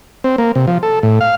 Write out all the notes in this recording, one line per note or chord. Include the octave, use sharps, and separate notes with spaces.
C4
A#3
C3
F3
A4
A2
F5